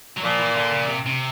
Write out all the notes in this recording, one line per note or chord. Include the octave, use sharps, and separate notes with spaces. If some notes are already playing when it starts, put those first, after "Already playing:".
F#3
A#2 F3
E3
D3
C#3
C3
C3